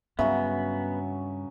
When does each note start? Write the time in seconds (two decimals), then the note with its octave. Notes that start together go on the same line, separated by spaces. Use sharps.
0.19 G2 C#3 F#3 B3 F#4 E5